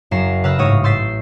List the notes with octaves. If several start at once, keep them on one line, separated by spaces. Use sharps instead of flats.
F#1 F#2 A#5 C7 E7
C#3 B4 F5 A#5 E6 F#6
A1 G#2 C#5 D#6 A#6
C6 E6 G6 A6 B6 C7